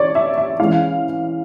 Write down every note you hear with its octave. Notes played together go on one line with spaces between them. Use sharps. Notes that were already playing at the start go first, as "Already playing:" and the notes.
Already playing: E3 C#5 D5
E5
E5
E3 G#3 C#4 E4 F5